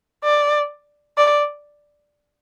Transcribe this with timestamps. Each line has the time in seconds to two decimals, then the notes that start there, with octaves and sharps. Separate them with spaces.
0.24 D5
1.18 D5